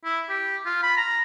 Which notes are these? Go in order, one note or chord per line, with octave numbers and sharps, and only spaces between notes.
E4
G4
F4
B5
A#5